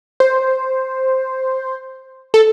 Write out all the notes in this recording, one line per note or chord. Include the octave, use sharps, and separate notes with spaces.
C5
A4